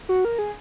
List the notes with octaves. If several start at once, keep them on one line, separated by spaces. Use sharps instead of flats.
F#4
A#4
G#4